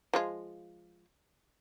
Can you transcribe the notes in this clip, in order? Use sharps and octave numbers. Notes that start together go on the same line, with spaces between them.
F3 G#3 F4